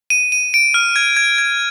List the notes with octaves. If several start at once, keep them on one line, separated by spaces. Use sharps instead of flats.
D#7
D#7
D7
F6
G#6
G#6
G#6